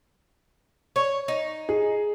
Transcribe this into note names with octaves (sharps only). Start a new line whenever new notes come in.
C#5
D#4
G#4